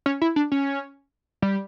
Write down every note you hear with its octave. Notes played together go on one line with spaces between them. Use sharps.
C#4
E4
D4
C#4
G3